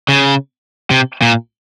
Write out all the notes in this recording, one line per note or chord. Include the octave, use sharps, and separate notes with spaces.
C#3
C3
A#2